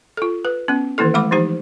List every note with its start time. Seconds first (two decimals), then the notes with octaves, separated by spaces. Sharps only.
0.17 F4 A4
0.45 B4
0.68 B3 C#4
0.98 D#3 E3 A#3 E4 A4
1.14 G#3 A3 F#5 B5 D6
1.31 E3 F3 D#4 G4 C5